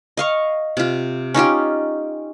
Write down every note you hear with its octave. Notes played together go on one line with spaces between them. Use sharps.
D#5 F5 C#6
C3 F4
C#4 D#4 F4 G4